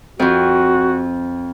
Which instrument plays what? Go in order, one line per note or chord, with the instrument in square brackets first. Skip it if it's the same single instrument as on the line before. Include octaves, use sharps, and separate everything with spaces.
[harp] F2 F3 [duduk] F#4